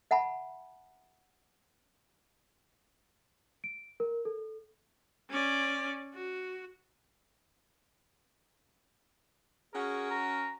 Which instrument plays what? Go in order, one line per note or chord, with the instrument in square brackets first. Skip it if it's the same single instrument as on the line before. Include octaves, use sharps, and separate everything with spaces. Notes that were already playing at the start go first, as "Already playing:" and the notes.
[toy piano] E5 F#5 A5 B5
[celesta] D7
A#4
A4
[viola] C#4 D5
F#4
[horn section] C#4 F#4 A#4 [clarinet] G#4
[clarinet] A#5